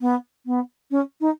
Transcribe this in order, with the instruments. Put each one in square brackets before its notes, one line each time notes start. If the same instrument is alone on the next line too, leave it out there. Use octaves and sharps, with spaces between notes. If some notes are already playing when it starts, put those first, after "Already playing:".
[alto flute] B3
B3
C#4
D#4